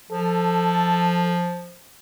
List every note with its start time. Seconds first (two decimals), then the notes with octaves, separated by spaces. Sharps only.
0.11 F3 A4